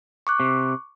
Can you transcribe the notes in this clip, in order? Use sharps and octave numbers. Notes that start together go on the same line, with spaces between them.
C#6 D6 F#6
C3